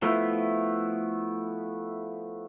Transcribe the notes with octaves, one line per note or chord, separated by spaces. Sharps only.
F3 A3 B3 E4